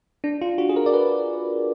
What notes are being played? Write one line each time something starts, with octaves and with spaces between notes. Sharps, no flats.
D4
F4
F#4
G#4
A#4
D5
B4